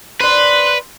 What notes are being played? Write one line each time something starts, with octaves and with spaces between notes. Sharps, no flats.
B4 C5 D5 C6 F#6